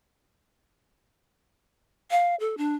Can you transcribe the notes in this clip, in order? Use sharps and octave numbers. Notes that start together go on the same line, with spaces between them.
F5
A4
D4